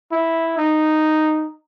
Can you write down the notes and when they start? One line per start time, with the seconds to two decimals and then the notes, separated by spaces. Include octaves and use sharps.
0.12 E4
0.58 D#4